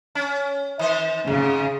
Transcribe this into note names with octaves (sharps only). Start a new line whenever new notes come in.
C#4
D#3 C5
G#2 C#3